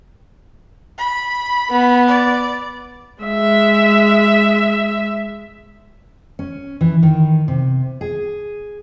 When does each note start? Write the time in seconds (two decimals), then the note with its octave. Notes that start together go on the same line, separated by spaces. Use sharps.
0.98 B5
1.69 B3
2.08 D5
3.23 G#3 E5
6.39 C#4
6.81 E3
7.03 D#3
7.48 C3
8.01 G#4